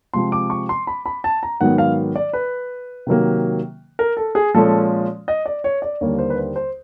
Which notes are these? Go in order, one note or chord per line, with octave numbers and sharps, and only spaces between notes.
C3 F3 G#3 C4 C6
D6
C#6
C6
B5
B5
A5
A#5
G#2 D#3 F#3 B3 F#5
F5
D5
B4
C3 D#3 F#3 A#3
A#4
A4
G#4
A#2 F3 G#3 C#4 A4
D#5
D5
C#5
D5
D#2 D3 G3 A#3 C#5
C5
B4
C5
C5